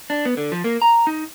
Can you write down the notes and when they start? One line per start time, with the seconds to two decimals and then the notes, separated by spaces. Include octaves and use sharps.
0.10 D4
0.25 B3
0.37 D3
0.52 F3
0.64 A#3
0.82 A#5
1.07 D#4